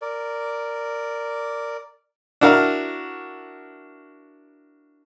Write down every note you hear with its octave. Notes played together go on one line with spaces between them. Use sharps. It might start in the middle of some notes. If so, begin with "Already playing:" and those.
A#4 D5
D4 E4 F#4 A#4 F5